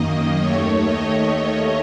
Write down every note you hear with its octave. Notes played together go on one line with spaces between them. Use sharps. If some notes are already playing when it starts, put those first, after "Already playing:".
Already playing: F#2 D#3 A#3 D#5
D#2 D#3 A3 C#5
D#5